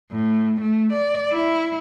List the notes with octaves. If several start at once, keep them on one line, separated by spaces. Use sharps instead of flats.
A2
A3
D5
E4